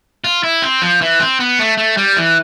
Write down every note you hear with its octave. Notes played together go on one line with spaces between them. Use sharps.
F4
E4
C4
F3
E3
C4
B3
A3
A3
G3
E3